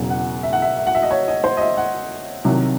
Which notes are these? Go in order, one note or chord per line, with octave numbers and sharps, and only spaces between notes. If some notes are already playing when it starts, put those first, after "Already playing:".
Already playing: E1 E2 C#3 F#3
F#5
E5
F#5
E5
E5
F#5
E5
D#5
C#5
D#5
C5
D#5
E5
F#5
C2 C3 D#3 F#3